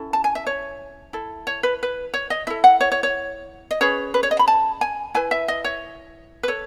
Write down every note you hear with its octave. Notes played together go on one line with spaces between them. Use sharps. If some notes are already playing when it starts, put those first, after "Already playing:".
Already playing: C#4 E4 A4
A5
G#5
E5
C#5
E4 A4
C#5
B4
B4
C#5
D#5
E4 A4 E5
F#5
C#5
C#5
C#5
D#5
C#4 G#4 B4 C#5
B4
C#5
D#5
B5
A5
G#5
E4 B4 G#5
E5
D#5
C#5
B4
A4 C#5